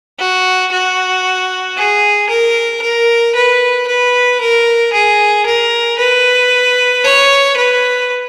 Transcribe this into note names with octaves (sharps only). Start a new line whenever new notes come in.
F#4
F#4
G#4
A#4
A#4
B4
B4
A#4
G#4
A#4
B4
C#5
B4